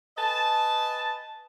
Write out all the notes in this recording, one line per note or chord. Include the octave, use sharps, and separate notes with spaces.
B4 D#5 G#5 A5